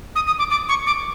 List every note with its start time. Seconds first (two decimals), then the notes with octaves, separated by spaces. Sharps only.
0.16 D#6
0.27 D#6
0.39 D6
0.51 D6
0.69 C#6
0.86 D6